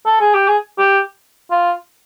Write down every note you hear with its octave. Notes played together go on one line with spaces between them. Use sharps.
A4
G#4
G4
G#4
G4
F4